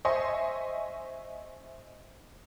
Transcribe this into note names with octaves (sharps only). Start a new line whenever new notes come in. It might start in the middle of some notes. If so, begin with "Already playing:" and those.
C5 D#5 E5 G#5 C6 C#6